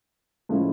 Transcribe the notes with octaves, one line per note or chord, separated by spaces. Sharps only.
A2 F3 G#3 C#4 E4